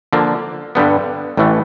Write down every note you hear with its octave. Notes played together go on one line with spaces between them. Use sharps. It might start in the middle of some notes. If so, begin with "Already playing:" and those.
D3 F3 A#3
G2 D3 G3 B3
A1 A2 E3 A3